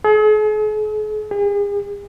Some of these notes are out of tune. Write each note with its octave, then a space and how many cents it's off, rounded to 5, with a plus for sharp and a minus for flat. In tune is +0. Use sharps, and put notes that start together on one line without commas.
G#4 +45
G#4 -40